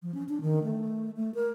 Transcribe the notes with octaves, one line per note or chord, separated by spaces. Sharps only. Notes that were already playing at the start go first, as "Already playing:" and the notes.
F3
C#4
D4
D#3
A3
A3
A#4